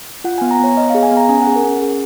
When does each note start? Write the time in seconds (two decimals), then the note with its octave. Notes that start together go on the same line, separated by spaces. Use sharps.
0.24 F4 F#5
0.38 B3 G#5
0.51 A#5
0.60 B3 C#5
0.77 B3 D#5
0.90 G#4 F5
1.03 G#5
1.11 B3
1.17 A#5
1.29 C#4 G#5
1.42 F#5
1.47 G#4
1.56 A#4
1.64 C#4
1.82 G#4